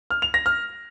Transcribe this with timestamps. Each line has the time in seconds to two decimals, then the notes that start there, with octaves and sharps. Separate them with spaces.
0.10 F6
0.22 F7
0.34 A#6
0.46 F6